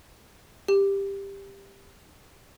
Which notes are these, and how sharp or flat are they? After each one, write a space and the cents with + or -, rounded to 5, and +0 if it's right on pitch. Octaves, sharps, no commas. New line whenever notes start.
G4 +10